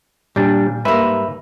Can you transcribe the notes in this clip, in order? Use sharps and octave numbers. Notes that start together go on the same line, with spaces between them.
A#2 G3 D4
G#2 G3 A#3 B4 E5